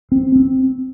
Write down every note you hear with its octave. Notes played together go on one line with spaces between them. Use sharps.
C4
C4